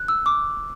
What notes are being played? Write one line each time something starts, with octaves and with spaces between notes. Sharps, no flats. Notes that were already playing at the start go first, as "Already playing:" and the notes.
Already playing: F#6
E6
D6